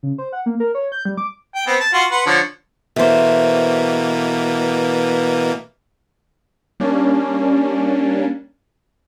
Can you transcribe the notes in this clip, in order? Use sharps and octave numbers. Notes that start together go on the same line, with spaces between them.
C#3
C5
F#5
A#3
A#4
C#5
G6
G3
D6
G5
B3 C4
A5
F4 F#4 C6
B4 F#5 C6
D3 F3 C#5
B2 E3 A3 A#3 C5
G3 A#3 C#4 D4